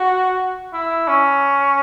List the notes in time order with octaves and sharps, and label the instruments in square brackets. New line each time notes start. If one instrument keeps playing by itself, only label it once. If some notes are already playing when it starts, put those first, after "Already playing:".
Already playing: [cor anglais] F#4
E4
C#4